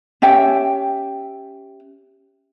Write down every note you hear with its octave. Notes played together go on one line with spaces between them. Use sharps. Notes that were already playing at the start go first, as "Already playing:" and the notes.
C#4 G4 E5 G5